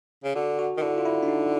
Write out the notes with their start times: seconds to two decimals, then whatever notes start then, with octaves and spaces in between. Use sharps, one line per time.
0.24 C#3
0.35 D3 F#4
0.59 F#4
0.77 D#3
0.82 D3 E4
0.98 F4
1.05 E4
1.23 D4
1.28 D#4